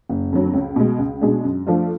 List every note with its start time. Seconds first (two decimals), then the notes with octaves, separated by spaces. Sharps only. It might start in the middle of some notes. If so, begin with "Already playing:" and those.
0.09 F#1
0.32 F2 D3 F#3
0.54 C#2
0.76 B2 G#3
0.99 C#2
1.21 B2 G#3 D4 G#4
1.44 F#2
1.67 F3 A3 D4 F4